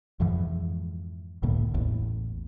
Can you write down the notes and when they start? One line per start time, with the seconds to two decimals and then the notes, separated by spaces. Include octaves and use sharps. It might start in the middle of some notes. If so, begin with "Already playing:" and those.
0.20 F2 G#2 E3 F3
1.43 C#2 A2 D3 A#3
1.74 A1 E2 A2